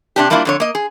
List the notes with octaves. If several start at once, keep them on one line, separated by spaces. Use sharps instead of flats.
C3 D4 G4
G3 A3 A#3 D4 E4 F4
F2 D3 C#5
A#3 D#5
G#4